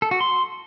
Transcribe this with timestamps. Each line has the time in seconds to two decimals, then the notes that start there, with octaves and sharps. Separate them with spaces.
0.02 A4
0.11 F#4
0.21 C6